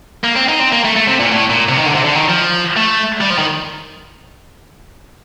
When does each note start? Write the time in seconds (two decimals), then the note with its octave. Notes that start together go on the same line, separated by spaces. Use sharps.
0.24 A#3
0.36 C4
0.49 D#4
0.60 C4
0.73 A#3
0.85 A3
0.96 A3
1.08 C3
1.20 A#2
1.32 A2
1.50 A#2
1.69 C3
1.77 D#3
1.86 D3
1.95 C3
2.05 D3
2.15 D#3
2.29 F3
2.76 A3
3.20 G3
3.30 F3
3.38 D#3